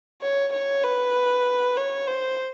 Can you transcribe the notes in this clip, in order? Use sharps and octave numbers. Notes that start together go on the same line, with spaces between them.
C#5
C#5
B4
C#5
C5